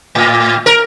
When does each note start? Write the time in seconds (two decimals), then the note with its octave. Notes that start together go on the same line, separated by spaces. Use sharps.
0.15 A2
0.66 A#4